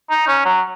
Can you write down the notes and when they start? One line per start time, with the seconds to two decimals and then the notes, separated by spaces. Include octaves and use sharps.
0.10 D#4
0.28 C#4
0.45 F#3